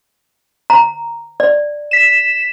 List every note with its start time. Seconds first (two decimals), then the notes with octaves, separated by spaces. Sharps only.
0.70 A#5
1.40 D5
1.91 B6 E7